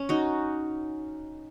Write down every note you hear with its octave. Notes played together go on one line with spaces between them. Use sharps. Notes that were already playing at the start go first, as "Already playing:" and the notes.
Already playing: C#4
D#4 F#4